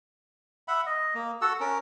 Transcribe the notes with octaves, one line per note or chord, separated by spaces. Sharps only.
E5 F#5 B5
D#5
A#3
F#4 A4 F#5 E6
C#4 A#4